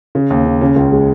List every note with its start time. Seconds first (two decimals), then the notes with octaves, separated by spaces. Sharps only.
0.15 C#3
0.30 D#2
0.45 C#3
0.61 C#3
0.76 C#2
0.92 G#3